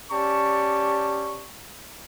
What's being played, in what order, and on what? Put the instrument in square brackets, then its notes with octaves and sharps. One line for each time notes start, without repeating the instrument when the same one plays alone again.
[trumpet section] C#4 G4 D5 A5 C#6